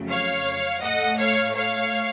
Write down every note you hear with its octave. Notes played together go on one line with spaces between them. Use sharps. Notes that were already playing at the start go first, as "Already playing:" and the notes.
Already playing: F2 C#3 F#3 A3
C#5 F5
A2 A3 D#5 F#5
C#5 F5
C#5 F5